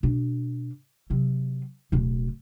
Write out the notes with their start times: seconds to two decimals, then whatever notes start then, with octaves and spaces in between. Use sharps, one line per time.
0.03 B2 D4
1.10 C3 F#3
1.92 D1 B2